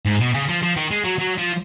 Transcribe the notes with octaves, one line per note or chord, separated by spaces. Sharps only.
G#2
B2
C#3
F3
F3
D#3
G#3
F#3
F#3
F3